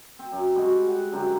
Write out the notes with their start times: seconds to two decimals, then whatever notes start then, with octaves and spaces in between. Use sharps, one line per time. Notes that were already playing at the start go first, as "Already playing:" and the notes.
0.19 C4
0.32 F#2
0.55 G3 G#3 C4 F#4
0.88 F#5
1.12 F#2 D3 A#4 G5